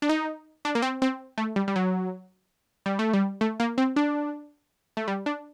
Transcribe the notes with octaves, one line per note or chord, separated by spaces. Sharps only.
D4
D#4
D4
A#3
C4
C4
A3
G3
G3
F#3
G3
A3
G3
A3
A#3
C4
D4
A3
G3
D4